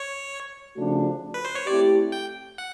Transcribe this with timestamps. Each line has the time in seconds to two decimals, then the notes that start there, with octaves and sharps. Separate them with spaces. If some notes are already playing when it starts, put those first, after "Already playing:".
Already playing: C#5
0.75 C#3 F3 A3 D4 F#4
1.34 B4
1.45 C5
1.55 C#5
1.67 A3 C4 E4 G4 D5
2.12 G5
2.58 F#5